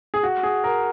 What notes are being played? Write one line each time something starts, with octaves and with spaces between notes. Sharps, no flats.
G#4
F#4
G#4
A#4